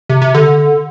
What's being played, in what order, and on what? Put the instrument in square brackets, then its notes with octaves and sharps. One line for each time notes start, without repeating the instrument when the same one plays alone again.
[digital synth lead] C3
C3
D3